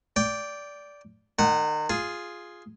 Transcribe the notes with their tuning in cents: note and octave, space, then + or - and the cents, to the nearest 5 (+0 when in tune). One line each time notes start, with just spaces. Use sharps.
D5 -15 G5 +0
D#3 -30 F#5 +0
F4 +0 G#4 +0